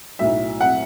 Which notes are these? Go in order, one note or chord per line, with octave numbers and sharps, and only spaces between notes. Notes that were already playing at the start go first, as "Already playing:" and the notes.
B1 A2 F#3 E5
F#5